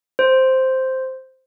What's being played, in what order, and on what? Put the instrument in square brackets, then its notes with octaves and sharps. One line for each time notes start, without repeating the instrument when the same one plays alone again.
[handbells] C5